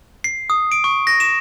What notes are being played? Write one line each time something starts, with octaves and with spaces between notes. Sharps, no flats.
C7
D#6
D7
C#6
A#6
E7